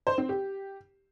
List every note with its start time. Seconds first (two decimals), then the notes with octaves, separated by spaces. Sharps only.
0.07 C5
0.18 C4
0.29 G4